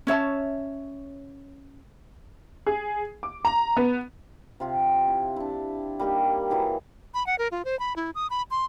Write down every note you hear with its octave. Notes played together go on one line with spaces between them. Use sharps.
C#4 C#5 E5 A5
G#4
D6
A#5
B3
C3 F4 G4
E4
D4 E4
G3 A#3 D#4 G4
E3 F#3 G#4
B5
F#5
A#4
F4
C5
B5
E4
D#6
B5
C6